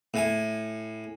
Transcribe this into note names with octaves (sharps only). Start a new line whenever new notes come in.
A2 G#5